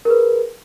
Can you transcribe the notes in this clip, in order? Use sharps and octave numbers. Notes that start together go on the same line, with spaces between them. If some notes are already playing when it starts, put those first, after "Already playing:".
G#4 A#4 B4